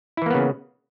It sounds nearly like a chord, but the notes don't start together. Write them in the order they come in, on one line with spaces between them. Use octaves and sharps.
E4 E3 A#3 B3 C#3